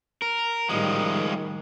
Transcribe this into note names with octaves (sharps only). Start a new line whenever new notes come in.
A#4
A2 D#3 F3 G3 G#3